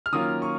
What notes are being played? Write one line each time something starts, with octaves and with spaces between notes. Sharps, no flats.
F6
D#3 F#3 A#3 C#4 F4 D#6
C#6